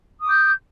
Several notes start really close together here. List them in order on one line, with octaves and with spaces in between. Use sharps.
D#6 D6 G6